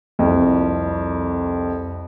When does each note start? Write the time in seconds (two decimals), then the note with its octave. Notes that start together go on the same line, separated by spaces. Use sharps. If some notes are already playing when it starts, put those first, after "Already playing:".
0.19 C2 F2